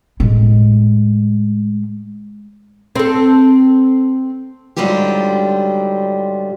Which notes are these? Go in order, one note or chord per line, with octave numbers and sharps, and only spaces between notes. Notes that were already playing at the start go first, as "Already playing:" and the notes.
A2 G#3
C4 A4
G#2 D3 F#3 G3 F4 G4